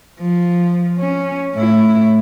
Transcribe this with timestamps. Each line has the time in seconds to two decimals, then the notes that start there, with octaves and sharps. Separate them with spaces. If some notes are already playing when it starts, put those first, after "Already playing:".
0.20 F3
0.99 C#4
1.55 A2 E4